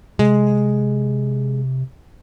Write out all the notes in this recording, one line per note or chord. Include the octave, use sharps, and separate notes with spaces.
C3 G#3